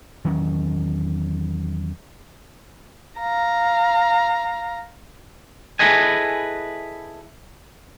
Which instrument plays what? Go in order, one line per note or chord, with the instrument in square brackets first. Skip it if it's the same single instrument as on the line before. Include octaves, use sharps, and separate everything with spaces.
[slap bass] E2 D#3 F#3 C#4
[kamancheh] F5 A#5
[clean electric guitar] E4 G#4 A4 B4 D#5 G#5